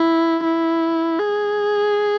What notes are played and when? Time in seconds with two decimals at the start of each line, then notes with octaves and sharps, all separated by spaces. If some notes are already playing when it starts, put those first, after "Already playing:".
Already playing: E4
0.44 E4
1.19 G#4